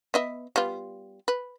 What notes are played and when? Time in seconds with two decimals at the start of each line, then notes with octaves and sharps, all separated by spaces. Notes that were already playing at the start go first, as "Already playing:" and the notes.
0.14 B3 D#5 E5
0.56 G3 B3 F4
1.28 B4